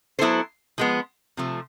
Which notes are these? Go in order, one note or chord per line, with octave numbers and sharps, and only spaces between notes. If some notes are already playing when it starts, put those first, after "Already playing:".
F#3 B3 E4 A4 C5
F3 G#3 B3
C3 F3 A3